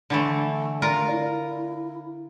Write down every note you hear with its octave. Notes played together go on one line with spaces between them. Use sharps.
D3 E3 A3
F4 A#4 D5 A#5
E4